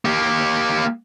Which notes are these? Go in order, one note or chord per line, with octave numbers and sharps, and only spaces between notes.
A#3 G4